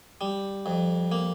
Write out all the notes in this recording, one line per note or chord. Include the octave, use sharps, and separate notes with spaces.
G3
F2
A#3